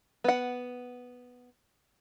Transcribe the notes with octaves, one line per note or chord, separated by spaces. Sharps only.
B3 F#5